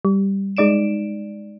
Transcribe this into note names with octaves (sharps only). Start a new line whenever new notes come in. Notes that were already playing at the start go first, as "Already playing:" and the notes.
G3
G#3 D#4 D5 D7 E7